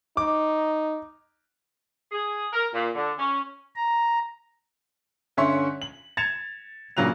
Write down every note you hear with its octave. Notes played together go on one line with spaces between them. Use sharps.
D#4 D6
G#4
A#4
A#2
D3
C#4
A#5
G2 D3 C#4 E5 C6 C#6
F#7
G#6 A6 C#7 E7 F7
G2 A#2 C#3 F#3 F#6 F7